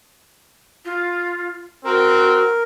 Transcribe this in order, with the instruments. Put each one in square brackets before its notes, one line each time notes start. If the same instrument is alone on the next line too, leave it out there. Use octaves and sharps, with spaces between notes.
[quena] F4
[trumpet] C4 [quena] F#4 [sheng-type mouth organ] A#4